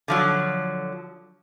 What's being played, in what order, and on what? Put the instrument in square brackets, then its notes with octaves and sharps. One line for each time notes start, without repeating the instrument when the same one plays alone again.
[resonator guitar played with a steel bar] D3 F3 F#3